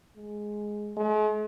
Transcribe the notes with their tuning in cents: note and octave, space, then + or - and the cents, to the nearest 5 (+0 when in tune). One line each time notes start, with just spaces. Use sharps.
G#3 +5
G#3 +45